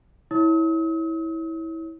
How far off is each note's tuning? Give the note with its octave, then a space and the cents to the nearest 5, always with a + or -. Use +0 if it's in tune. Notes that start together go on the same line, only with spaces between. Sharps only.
E4 -20 C#5 +0 D#6 +45